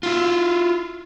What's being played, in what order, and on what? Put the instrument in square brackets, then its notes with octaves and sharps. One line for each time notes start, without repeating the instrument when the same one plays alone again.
[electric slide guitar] E4 F4